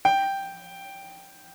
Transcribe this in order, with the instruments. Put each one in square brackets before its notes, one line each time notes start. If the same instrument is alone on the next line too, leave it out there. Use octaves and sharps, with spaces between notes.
[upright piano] G5